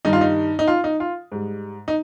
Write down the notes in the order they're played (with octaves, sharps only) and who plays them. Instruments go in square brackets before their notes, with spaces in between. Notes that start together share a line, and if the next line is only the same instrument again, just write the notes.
[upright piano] G2 D#3 G3 D#4
F4
D#4
D#4
F4
D#4
F4
G#2 G3
D#4